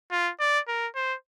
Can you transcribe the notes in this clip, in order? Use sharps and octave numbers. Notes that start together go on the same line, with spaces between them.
F4
D5
A#4
C5